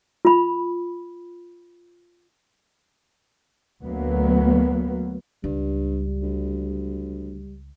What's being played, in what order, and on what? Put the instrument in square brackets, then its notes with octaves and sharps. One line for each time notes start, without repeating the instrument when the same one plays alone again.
[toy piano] F4 B5
[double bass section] D2 F#3 A#3 B3
[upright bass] C#2 [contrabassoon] G2 [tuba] G3
[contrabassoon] D2